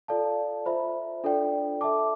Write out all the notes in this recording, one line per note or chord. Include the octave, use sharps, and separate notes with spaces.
F4 A4 D5 F5 A5
F4 C5 E5 B5
D4 F4 A4 D5 G5
A4 E5 A5 D6